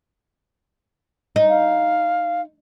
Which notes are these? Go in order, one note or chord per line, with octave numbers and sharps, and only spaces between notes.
D#4
F5